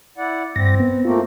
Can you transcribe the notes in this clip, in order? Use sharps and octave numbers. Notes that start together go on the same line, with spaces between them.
E4 D5 F#5
G2 C4 A#6
B3
A3 A#3 C4 F4